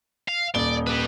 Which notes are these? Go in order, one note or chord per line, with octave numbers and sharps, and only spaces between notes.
F5
D#1 D5 G7
G4 B4